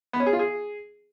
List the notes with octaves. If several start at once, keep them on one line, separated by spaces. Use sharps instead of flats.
B3
C#4
G#4
F4
G#4